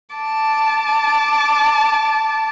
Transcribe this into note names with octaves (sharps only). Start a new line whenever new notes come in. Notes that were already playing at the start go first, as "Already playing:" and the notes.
A5 D6